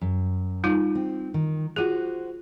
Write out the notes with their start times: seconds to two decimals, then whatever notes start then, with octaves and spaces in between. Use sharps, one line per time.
0.01 F#2
0.64 G3 D#4 F4
0.95 C4
1.34 D#3
1.76 F4 F#4 G#4 C5